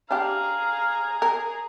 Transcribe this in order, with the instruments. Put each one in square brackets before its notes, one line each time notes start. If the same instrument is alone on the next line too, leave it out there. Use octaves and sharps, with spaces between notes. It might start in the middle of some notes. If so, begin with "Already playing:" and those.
[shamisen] D4 F4 G4 [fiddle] G#4 A#5 [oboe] F5
[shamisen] A#4